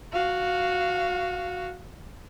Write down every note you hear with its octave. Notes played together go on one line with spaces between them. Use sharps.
F#4 F5